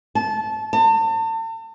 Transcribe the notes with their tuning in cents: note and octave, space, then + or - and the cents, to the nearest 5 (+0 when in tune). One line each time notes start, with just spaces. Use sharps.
A5 -20
A5 +40